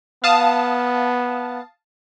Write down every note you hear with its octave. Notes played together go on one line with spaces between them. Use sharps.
B3 F5 A5 D#6